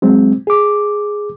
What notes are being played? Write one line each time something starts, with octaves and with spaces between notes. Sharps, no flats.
F#3 G#3 C4
G#4 D6